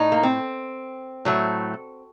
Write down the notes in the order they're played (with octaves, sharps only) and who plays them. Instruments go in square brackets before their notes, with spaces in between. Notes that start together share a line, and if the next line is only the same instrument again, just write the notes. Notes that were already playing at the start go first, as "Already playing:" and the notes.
Already playing: [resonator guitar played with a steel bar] A2 D#4
A#3
C4
A2 F#3 A3